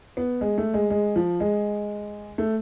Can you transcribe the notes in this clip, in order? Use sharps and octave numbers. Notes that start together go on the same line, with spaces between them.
B3
G#3
A3
G#3
G#3
F3
G#3
A3